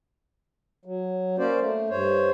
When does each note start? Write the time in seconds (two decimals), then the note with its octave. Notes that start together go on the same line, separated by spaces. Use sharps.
0.85 F#3
1.39 A#3 C#4 C5 D5
1.61 A3
1.90 G2 C5 C#5